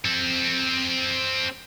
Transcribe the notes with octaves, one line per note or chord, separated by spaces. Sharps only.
C4 A4